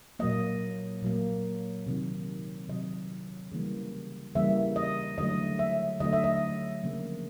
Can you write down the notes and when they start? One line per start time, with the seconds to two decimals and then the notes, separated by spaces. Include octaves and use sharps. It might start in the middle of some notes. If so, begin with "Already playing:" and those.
0.19 A#2 F#3 A#3 D#5
1.03 A#2 F#3 A#3
1.87 C3 D#3 F#3
2.69 C3 D#3 F#3 D#5
3.52 C#3 E3 G3 A#3
4.35 C#3 E3 G3 A#3 E5
4.76 D#5
5.18 D3 F#3 A3 D#5
5.59 E5
6.00 D3 F#3 A3 D#5
6.13 E5
6.24 D#5
6.83 C#3 F3 A#3